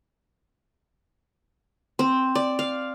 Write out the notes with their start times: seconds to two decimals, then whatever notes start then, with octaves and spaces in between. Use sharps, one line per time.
1.99 C4
2.35 D5
2.59 F5